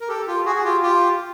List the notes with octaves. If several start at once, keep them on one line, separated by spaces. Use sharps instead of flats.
A#4
G4 A4
F4 G4
F#4 G#4
G#4
F4 G4
F4 G4